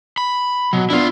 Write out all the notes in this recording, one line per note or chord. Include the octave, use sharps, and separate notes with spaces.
B5
B2 F#3
B3 D4 E4 F4